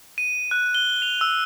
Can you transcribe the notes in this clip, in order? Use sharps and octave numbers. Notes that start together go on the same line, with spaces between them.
D#7
F#6
G7
F7
E6